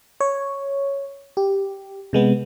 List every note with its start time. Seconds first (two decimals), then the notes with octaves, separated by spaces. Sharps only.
0.20 C#5
1.37 G4
2.13 C3 G#3 B3